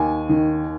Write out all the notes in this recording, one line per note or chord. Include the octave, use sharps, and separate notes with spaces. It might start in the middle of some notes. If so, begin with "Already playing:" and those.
Already playing: D#2 G#5
D#3